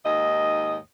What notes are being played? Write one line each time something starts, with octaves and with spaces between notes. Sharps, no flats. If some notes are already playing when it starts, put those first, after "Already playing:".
D#2 G#2 D#5